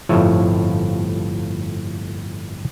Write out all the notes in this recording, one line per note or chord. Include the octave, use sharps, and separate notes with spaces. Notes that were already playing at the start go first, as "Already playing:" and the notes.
G1 F2 A2 F3 C#5 E5